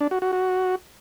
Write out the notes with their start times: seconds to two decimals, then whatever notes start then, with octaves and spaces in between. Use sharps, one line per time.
0.01 D4
0.11 F#4
0.22 F#4
0.33 F#4